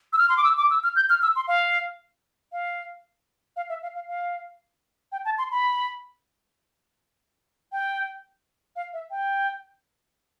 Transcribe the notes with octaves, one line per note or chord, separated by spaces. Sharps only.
E6
F6
C6
D6
E6
D6
E6
F6
G6
F6
E6
C6
F5
F5
F5
E5
F5
F5
F5
G5
A5
C6
B5
G5
F5
E5
G5